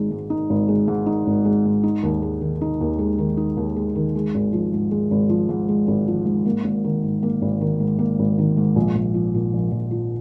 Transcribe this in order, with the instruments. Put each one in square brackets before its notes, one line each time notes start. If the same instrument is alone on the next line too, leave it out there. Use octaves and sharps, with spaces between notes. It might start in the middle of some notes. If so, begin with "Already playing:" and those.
Already playing: [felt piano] G#1 G#3 D#4
G#2
D#4
G#1
G#3
G#2
D#4
G#1
G#3
G#2
D#4
D#2
G#3
D#3
D#4
D#2
G#3
D#3
D#4
D#2
G#3
D#3
G#3
G#1
F3
G#2
G#3
G#1
F3
G#2
G#3
G#1
F3
G#2
A#3
G#1
D#3
G#2
A#3
G#1
D#3
G#2
A#3
G#1
D#3
G#2
A#1
A#1
F3
A#2
A#1
A#1
F3